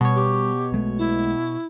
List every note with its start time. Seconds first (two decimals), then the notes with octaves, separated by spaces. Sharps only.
0.01 B2 G3 C#5
0.15 G4
0.72 B1 G#3 A3
0.99 E4